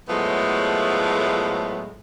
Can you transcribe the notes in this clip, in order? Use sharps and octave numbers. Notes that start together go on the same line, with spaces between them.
A2 F3 F#3 G#3 A3 B3